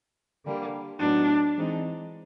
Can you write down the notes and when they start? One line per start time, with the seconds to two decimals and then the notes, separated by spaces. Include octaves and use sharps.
0.45 D3 G3 A#3
0.99 A2 F#3 B3 D4 D#4
1.56 E3 G#3 C4 D#4